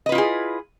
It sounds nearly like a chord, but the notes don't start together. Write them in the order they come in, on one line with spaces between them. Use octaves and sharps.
D#5 B4 F4 E4 G#4